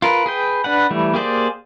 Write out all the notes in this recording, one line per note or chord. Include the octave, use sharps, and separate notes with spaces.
F4 A#4 B4
G#4 B4 G5
D4 B4 F#5
E3 G3 A3
A#3 G4 G#4 C5 D5